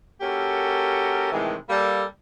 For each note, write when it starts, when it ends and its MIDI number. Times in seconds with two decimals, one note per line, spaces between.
0.21 1.31 58
0.21 1.31 61
0.21 1.31 66
0.21 1.31 67
0.21 1.31 69
0.21 1.31 70
1.32 1.55 45
1.32 1.55 48
1.32 1.55 51
1.32 1.55 52
1.32 1.55 56
1.70 2.03 55
1.70 2.03 58
1.70 2.03 69